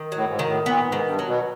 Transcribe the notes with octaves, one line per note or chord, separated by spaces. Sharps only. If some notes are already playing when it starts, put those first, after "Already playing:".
Already playing: D#3
A2 F#3
G#2
D#3
A2
A#2 B3
G#2
D#3
G2
F#3
B2